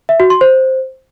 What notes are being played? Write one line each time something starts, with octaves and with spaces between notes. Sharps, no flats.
E5
F#4
C6
C5